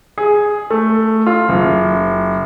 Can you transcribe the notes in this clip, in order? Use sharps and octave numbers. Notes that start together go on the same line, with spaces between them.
G#4
A3
F4
F#1